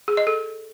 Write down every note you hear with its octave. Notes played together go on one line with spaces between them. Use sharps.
G#4
D#5
A4